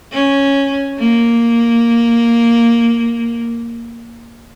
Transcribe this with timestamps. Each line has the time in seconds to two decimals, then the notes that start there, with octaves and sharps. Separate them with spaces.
0.12 C#4
0.98 A#3